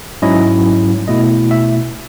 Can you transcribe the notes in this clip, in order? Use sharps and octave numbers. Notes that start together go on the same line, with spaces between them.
G#2 F#3 C#4 E4 D#5
B2 A3 E4 D#5
E5